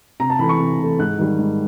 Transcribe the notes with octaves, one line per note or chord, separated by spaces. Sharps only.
C3 A#5
A5
E3 A3 B5
C#6
C3
E3 A3
G#2 F#6
D#3 G3
G#2